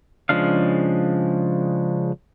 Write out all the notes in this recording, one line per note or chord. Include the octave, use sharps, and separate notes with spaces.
C#3 F3 G#3 D4 F5